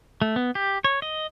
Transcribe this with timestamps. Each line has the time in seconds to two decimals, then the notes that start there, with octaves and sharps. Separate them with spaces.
0.22 A3
0.36 B3
0.55 G4
0.84 C#5
1.02 D#5